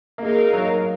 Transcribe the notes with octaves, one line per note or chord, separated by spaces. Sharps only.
A#3
G#3 D#4 A#4 F5
F#3